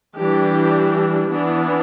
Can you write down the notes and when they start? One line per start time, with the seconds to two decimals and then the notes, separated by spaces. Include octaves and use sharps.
0.18 E3 G3 D4 G4
1.31 E3 B3 D4